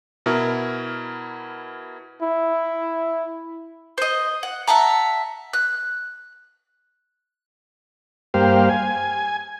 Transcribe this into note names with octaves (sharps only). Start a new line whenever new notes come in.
B2 E4 A#4
E4
C5 D#5
F#5
E5 F#5 A5 A#5
F#6
G2 A#3 G4 C5 F5
G#5